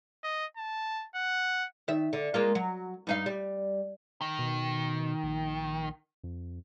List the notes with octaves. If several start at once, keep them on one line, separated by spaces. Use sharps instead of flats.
D#5
A5
F#5
D#3 E5
D3
G#3 A#3 F4
F#3
G2 D#4 F5
G3
D#3
B2
A#1
F2